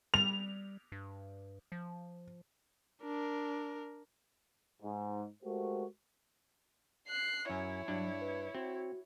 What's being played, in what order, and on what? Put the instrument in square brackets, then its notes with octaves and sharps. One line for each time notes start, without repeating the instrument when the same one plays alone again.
[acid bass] G3 [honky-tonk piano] F7
[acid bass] G2
F3
[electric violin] D4 A#4
[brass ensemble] G#2
G#3 A3 F#4 G4 A#4 C5
[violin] F#6 C7
[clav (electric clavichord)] F#2 [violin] E4 C#5 [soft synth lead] G#5
[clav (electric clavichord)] G2 D4 [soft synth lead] F#3
[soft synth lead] B4
[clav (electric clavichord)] C4 [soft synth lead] F#4